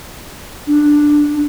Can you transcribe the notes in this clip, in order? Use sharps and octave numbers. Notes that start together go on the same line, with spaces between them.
D4